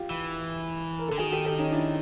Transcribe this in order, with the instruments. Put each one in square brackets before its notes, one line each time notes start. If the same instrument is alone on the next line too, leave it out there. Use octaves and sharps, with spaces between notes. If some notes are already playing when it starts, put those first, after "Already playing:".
Already playing: [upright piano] F4 G4
[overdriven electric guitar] E3
[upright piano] A#4
[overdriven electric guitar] D3 [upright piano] A4
[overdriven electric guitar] D#3 [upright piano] F#4 G#4
[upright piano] G4 A4
G4 A4
C#4 D#4
D4 E4